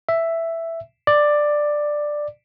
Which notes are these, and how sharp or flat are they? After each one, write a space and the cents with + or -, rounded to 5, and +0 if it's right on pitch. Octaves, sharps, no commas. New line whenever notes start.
E5 +5
D5 +10